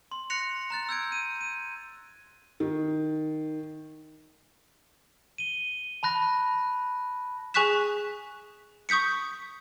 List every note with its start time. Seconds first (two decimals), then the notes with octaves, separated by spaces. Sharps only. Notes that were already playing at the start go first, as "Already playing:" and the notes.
0.11 C6
0.30 F#6 A#6 C#7 F7
0.70 A#5 F#6 A6
0.89 E6 G6 G#6 D7
1.12 D#7
1.41 D#7
2.60 D#3
5.38 D#7 G7
6.03 A5 B5 F#6 A#6
7.54 G#4 G#5 C#6 F#6 B6 E7
8.89 C#6 D#6 G6 B6 C#7